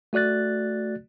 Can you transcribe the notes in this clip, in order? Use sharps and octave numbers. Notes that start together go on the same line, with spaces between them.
A3 F#4 D5 F#6 A6